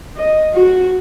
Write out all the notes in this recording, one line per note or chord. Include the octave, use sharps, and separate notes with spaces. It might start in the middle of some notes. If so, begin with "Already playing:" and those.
D#5
F#4